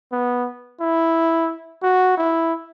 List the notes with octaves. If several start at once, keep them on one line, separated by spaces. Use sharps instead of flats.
B3
E4
F#4
E4